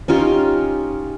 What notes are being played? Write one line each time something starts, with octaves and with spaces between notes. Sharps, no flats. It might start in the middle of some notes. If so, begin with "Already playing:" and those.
C#4 D#4 F4 G4